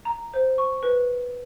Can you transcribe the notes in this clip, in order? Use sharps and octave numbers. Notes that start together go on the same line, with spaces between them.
A#5
C5
C#6
B4